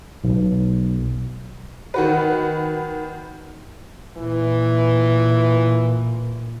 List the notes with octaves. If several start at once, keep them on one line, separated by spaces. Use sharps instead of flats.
B1
D#3 F#4 B4
A#2 E3